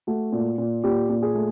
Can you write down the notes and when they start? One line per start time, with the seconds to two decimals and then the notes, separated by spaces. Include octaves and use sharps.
0.07 A3 F#4
0.32 A#2
0.58 A#2
0.84 A#2 G4
1.09 A#2
1.22 G#4
1.35 A3